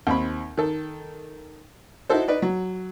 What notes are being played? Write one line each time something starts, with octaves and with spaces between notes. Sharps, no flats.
D#2 C4 B5
D#3 A4
D#4 E4 F#4 A4 C5
D#4 B4 D5
F#3